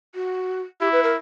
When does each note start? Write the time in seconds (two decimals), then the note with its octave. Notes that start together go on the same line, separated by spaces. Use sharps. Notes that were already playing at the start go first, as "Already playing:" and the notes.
0.15 F#4
0.81 E4 G4
0.92 B4
1.04 A#4